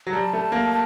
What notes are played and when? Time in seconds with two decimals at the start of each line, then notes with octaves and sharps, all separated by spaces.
0.07 F#3
0.13 G3 A5
0.33 A3
0.52 A#3